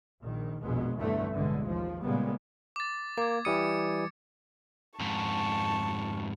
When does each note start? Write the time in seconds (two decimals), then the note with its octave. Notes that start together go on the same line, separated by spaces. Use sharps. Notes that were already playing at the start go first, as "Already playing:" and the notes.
0.21 A#1 D#3
0.61 A#1 F2 B2 G#3 B3
0.96 B1 E2 G2 D3 E3 A3
1.33 A1 G2 B2 D3 G#3
1.65 D#2 F3
2.03 A#2 C#3 G3 G#3 A#3 B3
2.76 D6 A6
3.18 A#3 D6 G#6
3.45 E3 G3 D#6 C#7
5.00 F2 G#2 A5 C#6